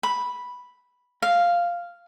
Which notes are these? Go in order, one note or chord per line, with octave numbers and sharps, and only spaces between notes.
B5
F5